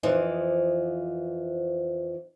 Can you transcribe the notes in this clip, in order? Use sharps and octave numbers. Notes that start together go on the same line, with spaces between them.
F2 E3 F3